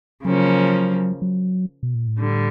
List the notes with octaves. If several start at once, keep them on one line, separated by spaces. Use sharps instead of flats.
C#3 F3 F#3 A#3 C#4
F#3
B2
A#2
A2
D3 G3